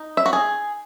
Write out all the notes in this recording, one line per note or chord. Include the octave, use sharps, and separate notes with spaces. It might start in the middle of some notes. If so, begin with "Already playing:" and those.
Already playing: D#4
E5
F#4
G#4